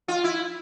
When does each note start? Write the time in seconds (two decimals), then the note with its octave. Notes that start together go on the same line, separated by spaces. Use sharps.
0.08 F4
0.24 E4